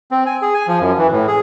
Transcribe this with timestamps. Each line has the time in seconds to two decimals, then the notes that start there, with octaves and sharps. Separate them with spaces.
0.11 C4
0.26 G#5
0.42 G#4
0.54 G#5
0.68 F3
0.81 F#2
0.98 E3
1.12 A2
1.27 G#4